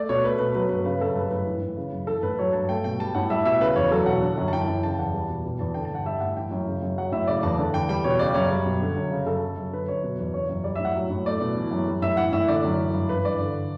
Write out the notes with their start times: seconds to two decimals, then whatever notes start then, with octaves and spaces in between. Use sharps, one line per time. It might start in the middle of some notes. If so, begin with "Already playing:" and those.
Already playing: A3 D5
0.09 B2 C#5
0.24 A3 B4
0.39 B2 B4
0.55 F#3 B4
0.69 G2 B4
0.85 C#3 B4
1.01 F#2 A4
1.15 G3 B4
1.31 A2 B4
1.46 E3
1.61 A2
1.77 C#3
1.92 F#2
2.07 E3 A4
2.23 A2 B4
2.39 F#3 C#5
2.53 G2 A5
2.69 A3 G5
2.84 B2 G5
2.99 G3 A5
3.15 A2 F#5
3.30 G3 E5
3.45 B2 E5
3.61 C#3 B4
3.76 E2 C#5
3.91 F#3 A4
4.06 B2 F#5
4.23 D3
4.37 F#2
4.48 A5
4.53 E3 G5
4.68 F#2
4.83 C#3 A5
4.99 E2 F#5
5.14 G3
5.29 B2
5.45 B2
5.59 E2 A5
5.74 D3 G5
5.85 A5
5.91 G2 F#5
6.05 G3 E5
6.20 A2 F#5
6.37 E3 G5
6.51 F#2
6.67 C#3
6.82 F#2
6.98 F#3 F#5
7.12 A2 E5
7.27 C#3 D5
7.43 E2 A5
7.58 D3
7.74 E2 G5
7.89 G3 G5
8.04 B2 C#5
8.19 C#3 D5
8.35 F#2 C#5
8.51 G3
8.66 B2
8.82 D3
8.96 F#2
9.11 C#3
9.26 F#2 A4
9.42 C#3
9.57 F#2
9.73 D3 B4
9.88 F#2 C#5
10.04 B2
10.19 E2
10.34 C#3 C#5
10.49 F#2
10.64 G3 D5
10.75 A2 E5
10.85 F#5
10.95 F#3
11.10 A2
11.26 A3 D5
11.41 B2
11.56 E3
11.71 F#2
11.88 G3
12.02 A2 E5
12.17 E3 F#5
12.32 A2 E5
12.48 D3 D5
12.64 F#2
12.78 E3
12.94 G2
13.09 E3 B4
13.25 G2 D5
13.40 D3